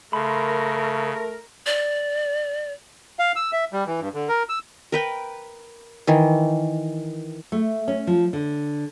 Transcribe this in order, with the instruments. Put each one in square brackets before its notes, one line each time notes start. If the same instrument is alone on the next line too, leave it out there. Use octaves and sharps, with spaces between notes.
[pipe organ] C#3 [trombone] A3 [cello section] A#4 [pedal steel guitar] B5 C6
[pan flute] D5
[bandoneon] F5
E6
E5
G3
E3
G2
D3
A#4
E6
[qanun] A#4 B4 G5
D#3 E3
[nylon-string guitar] A3
C#4
F3
D3